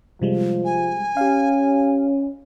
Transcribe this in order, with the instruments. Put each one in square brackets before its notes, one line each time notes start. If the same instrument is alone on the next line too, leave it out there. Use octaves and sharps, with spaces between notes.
[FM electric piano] C3 G3 G#3 [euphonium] F3
[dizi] G#5
[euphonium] C#4 [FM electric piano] G4 F5